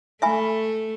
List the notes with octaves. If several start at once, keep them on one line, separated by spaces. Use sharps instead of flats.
A3 E5 G#5 B5